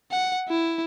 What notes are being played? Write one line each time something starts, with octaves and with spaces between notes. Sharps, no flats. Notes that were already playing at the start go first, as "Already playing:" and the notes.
F#5
E4